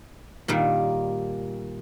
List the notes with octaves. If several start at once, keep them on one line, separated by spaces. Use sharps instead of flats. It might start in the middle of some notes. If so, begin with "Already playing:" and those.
A#2 D#3 G3